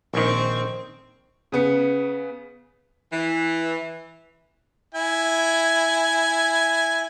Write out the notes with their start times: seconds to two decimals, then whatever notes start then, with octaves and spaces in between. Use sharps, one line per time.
0.14 A#1 D#3 C4 C#6
1.52 C#3 B3 C#7
3.12 E3
4.94 E4 G#5